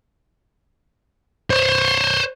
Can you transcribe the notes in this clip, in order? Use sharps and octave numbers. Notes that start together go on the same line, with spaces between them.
C5 C#5